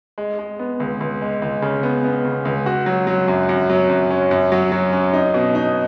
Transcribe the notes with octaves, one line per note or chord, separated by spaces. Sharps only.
G#3
G#3
B3
C#2
C#2
G#3
C#2
C#3
B3
B3
C#3
C#2
F#4
F#3
F#3
F#2
F#2
F#3
F#2
C#4
F#2
F#3
F#3
C#4
D#4
B2
D#4